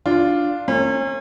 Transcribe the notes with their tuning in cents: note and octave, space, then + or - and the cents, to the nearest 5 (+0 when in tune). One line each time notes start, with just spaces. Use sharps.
D4 +0 F4 +0
A#3 -40 C#4 -40